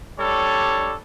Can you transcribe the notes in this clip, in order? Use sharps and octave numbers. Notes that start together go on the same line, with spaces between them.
G3 D4 A4 C#5